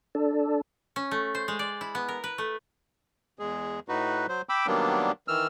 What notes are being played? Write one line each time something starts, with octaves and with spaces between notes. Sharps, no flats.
D4 A4
C#4
A3
C5
G#3
D5
E4
B3
A#4
B4
A3
E2 G#3 G#4
A2 D#4 F#4 B4
F#3 C5
G5 B5 D6 E6
D#3 F#3 G3 A#3 B3 D4
D#3 E3 E6 F6